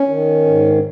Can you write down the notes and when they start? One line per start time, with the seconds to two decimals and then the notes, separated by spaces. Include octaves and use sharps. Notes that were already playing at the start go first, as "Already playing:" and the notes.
Already playing: C#4
0.09 D#3
0.46 G#2